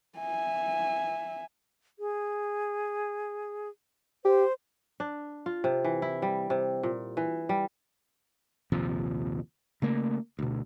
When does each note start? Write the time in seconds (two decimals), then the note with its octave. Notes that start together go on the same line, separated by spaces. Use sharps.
0.19 E5 G#5
1.99 G#4
4.25 G4 C5
5.00 D4
5.46 F4
5.64 C3
5.85 E3
6.02 E4
6.22 G3
6.50 C3
6.83 A#2
7.17 E3
7.49 G3
8.72 A#1 D#2 C3 F3
9.82 C#3 A3 A#3
10.39 D2 B2